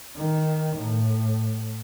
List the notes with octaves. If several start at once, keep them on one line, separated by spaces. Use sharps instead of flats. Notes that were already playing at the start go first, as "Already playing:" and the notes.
D#3
A2